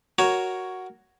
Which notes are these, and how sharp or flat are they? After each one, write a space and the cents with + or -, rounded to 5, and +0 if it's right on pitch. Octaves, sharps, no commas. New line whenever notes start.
F#4 +0 A#4 +0 C#5 +0